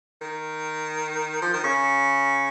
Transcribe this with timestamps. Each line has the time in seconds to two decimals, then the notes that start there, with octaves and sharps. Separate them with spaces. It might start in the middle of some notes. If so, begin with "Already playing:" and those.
0.21 D#3
1.42 F3
1.54 D#3
1.64 C#3